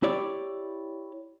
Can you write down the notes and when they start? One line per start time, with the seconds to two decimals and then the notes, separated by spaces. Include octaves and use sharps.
0.03 E4 G4 C#5 D5